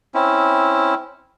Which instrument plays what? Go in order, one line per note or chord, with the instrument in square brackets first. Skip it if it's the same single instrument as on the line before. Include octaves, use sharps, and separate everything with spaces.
[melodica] C4 C#4 E4